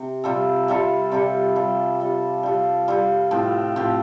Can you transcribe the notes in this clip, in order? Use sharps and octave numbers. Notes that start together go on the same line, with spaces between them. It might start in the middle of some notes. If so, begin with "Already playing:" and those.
Already playing: C3
C3 G3 F4 A4
C3 G3 F4 A4
C3 G3 F4 A4
G3 F4 A4
G3 F4 A4
G3 F4 A4
G3 F4 A4
A2 F3 C4 G4
A2 F3 C4 G4